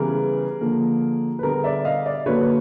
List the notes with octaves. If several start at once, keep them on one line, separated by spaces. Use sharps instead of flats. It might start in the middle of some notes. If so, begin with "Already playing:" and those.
Already playing: C#3 E3 G3 B3 G#4 A#4
D3 F3 A#3
B4
D3 G3 B3 G#4 A#4
D5 E5
D#5 F5
D5 E5
D3 F#3 A#3 B4 C#5